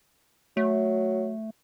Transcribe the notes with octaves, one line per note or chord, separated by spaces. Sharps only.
F#3 A3